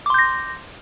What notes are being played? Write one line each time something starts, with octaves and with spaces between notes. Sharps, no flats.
C6 D6 G6 A#6